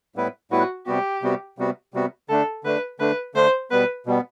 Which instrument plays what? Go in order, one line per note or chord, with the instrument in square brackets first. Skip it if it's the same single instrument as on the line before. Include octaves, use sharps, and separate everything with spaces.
[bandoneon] A2 G3 B3 E4 B4
[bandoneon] A2 G3 B3 E4 B4 [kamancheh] F#4
[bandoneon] C3 G3 B3 F#4 [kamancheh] G4
[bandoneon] C3 G3 B3 F#4
C3 G3 B3 F#4
C3 G3 B3 F#4
[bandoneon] D3 A3 D4 [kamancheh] A4
[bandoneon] D3 A3 D4 [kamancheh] B4
[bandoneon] D3 A3 D4 [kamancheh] B4
[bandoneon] D3 A3 D4 [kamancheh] C5
[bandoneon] B2 G3 B3 [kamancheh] B4
[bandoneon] B2 G3 B3